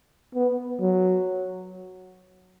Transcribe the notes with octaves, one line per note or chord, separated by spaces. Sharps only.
B3
F#3